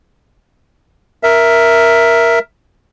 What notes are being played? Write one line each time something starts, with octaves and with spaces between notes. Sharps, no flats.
A#4 E5